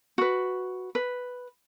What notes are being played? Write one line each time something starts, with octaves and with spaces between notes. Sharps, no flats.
F#4 B4
B4